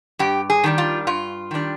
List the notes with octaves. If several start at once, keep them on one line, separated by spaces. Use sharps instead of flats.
G2 G4
G#4
D#3 G3 D4
F4
G2 F4
D#3 G3 D4